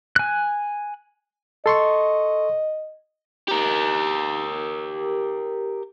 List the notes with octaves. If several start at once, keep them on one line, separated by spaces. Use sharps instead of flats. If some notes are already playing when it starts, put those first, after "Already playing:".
G#5 F#6
A4 D#5 C6 C#6
G4 A#4